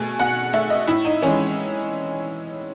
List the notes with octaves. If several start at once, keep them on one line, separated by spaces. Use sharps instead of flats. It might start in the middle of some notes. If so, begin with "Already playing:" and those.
Already playing: B2 A3 G#4
B2 F#5
A3 E5
D#5
A2 E4
D#4
E3 G#3 C#4